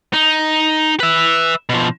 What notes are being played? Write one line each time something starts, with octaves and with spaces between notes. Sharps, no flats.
D#4
B4 E5
B2 F3